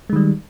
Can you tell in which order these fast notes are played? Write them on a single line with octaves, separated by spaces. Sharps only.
G#3 D#3 G3